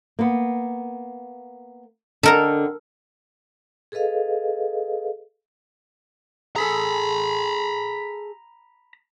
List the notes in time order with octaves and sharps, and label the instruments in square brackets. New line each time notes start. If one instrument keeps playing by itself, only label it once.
[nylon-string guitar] A#3 B3
[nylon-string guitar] D3 D#5 G5 [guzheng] A4 A#4 A#5
[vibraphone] G#4 A4 B4 D#5 F5
[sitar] G#4 A4 [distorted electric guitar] A#5 B5